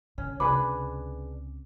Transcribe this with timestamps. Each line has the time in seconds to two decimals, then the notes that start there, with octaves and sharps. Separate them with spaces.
0.18 D3 C#4
0.40 C#2 C3 D4 G#4 B4 D6